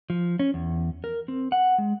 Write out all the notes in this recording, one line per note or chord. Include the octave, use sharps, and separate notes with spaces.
F3
C#4
E2
A#4
C4
F#5
G#3